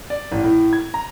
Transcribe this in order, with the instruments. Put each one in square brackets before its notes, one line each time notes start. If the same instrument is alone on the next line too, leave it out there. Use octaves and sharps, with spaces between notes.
[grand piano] D5
A1
A2
G#6
A#5